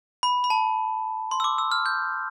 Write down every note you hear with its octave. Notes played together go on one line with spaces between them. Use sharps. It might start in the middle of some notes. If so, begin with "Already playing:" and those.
B5
B5
A5
C6
E6
D6
E6
F6
G6